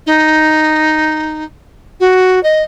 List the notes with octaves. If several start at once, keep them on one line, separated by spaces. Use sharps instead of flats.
D#4
F#4
D#5